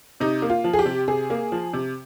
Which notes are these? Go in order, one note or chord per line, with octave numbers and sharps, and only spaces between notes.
C3 D#4
A#3
F4
F3
G#4
G4
C3
C3 G#4
A#3
F3
C3